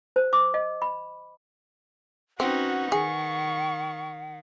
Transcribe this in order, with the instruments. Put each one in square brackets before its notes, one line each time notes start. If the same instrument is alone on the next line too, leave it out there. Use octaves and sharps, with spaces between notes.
[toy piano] C5
D6
D#5
B5
[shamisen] C4 [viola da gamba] C#4 D#4 B4 [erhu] F#4 [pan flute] F#5
[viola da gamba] D#3 [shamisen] G#4 [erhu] C#6